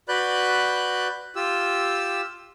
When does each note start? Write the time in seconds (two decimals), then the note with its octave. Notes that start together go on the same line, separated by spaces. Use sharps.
0.08 F#4 B4 D5 B5 F#6 G6
1.36 F4 G4 E6